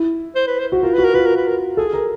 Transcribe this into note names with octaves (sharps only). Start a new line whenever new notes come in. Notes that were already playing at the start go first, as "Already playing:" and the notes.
Already playing: E4
C5
B4
C5
F#4
F4 A#4
F#4 B4
A#4
F4 B4
A#4
B4
A#4
G#4 A4
A#4